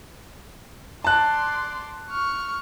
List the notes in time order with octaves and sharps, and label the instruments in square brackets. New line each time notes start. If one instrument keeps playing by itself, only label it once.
[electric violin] D5 C6 [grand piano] A5 F#6
[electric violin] C#6 F6